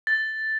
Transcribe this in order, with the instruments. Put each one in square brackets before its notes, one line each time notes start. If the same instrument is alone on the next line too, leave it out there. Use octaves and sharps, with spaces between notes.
[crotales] A6